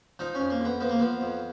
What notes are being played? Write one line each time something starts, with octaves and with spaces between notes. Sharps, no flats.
F3 D#4
F2 C#4
A#3
F2
B3
F3 B3
A#3
F3 B3
F2